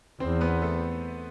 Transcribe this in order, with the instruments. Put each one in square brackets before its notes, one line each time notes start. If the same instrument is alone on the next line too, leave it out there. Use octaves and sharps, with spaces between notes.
[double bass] E2 [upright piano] C4 C5
[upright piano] B3 B4
A3 A4